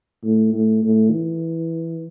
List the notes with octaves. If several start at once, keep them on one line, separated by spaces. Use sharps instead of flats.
A2
A2
A2
E3